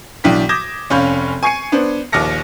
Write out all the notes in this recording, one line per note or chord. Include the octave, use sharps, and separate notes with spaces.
B1 E3 D4 G5 B6
D6 D#6 G6 G#6 A#6 E7
F1 C#4 C#5 F5 B5 G6
G#5 C#6 G#6 C7 C#7 D#7
B3 D4 C5
A#1 D#2 D6 F6 A#6 C#7